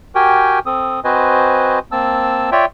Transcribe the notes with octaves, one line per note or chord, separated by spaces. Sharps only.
F#4 G4 A#4 G5 G#5
C4 A4 D#6
C4 F#4 B4 C5 D#5 G#5
A#3 C4 A5 E6
F4 C#5 D5 E5 G5